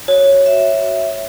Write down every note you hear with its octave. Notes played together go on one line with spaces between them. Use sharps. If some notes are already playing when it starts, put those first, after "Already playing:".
F#4 C#5
E5